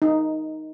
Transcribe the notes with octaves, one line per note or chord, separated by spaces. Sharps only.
D#4